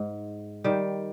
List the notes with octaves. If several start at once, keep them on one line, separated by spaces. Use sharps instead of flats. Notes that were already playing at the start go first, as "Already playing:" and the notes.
Already playing: G#2
D#3 G3